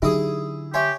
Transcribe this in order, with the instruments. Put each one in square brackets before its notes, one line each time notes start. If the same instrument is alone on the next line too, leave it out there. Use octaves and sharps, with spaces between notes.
[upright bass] D3 [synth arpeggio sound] F#3 D#4 G4 [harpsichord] E4 G#4
[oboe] G4 [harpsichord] C#5 [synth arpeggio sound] E5 G#5 C6